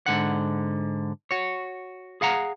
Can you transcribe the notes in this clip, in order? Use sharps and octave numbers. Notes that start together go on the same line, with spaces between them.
G#2 D3 F#5
F#4 C#5
G#4 F5 F#5 A#5